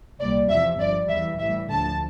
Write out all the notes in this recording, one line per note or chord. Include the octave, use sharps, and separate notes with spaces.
C2 A#2 G3 D5
E2 C3 F3 E5
G1 G2 F3 D5
E2 E3 G3 E5
A1 A2 E3 G3 E5
D2 D3 F3 A5